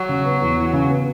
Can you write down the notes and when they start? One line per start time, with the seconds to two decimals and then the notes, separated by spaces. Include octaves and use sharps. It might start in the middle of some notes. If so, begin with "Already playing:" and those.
Already playing: F#3
0.09 C#3
0.25 B3
0.41 E2
0.57 E3
0.73 C#3
0.90 B3